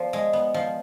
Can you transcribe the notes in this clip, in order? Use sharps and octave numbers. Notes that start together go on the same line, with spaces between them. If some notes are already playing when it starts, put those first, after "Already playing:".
Already playing: F3 B3 C5 D5
G#3
B3
F3